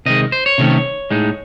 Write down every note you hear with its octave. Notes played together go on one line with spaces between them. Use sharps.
C3 D#3 G#3 D#5
C5
C#5
C3 D#3 A3 C#4
A2 G#3 D#4